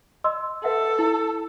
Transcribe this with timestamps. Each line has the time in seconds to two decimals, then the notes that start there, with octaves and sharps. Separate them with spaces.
0.24 D#5 C6 E6
0.64 A4 B4 E5 F#5
0.99 E4